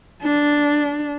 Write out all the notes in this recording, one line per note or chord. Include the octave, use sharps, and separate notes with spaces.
D4